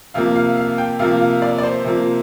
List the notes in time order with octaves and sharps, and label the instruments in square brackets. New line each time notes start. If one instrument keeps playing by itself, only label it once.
[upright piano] C3 F3 A#3 F5
F5
F5
G5
C3 F3 A#3 F5
F5
D5
D5
C5
C3 F3 A#3